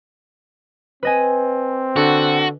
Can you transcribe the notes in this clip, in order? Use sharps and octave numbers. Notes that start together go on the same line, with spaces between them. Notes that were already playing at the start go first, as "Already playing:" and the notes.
C4 B4 D#5 G#5
D3 F#4